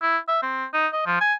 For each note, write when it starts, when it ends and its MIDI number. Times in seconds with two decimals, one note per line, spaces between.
0.02 0.18 64
0.28 0.39 76
0.42 0.65 60
0.73 0.88 63
0.93 1.05 75
1.06 1.20 53
1.21 1.34 80